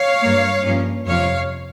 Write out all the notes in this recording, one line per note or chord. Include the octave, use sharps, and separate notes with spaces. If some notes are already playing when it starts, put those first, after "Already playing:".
Already playing: C#5 F5
G2 G3 A#3
G2 F3 A#3 C#4
F2 C3 F3 C#5 F5